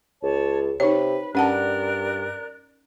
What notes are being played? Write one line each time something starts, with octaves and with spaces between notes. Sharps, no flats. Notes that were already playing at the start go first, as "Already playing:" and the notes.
C#2 C#5 A5
C3 D#4 B4 C#5
G2 C#4 A#4 D5 F#5 A5 F#6